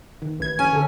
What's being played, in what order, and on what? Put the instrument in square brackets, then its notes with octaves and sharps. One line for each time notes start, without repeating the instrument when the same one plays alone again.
[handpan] D#3
[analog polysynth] A1 G#6 [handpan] B4
[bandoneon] C#4 [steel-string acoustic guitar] G#5
[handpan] D3 A4